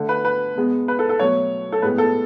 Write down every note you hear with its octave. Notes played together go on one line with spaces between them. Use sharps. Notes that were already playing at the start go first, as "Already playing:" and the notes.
Already playing: D3 A3
B4
B4
B2 G#3 B3
B4
A4
A4
B2 F#3 A3 C#5
A4
A2 G#3 B3 B4
A4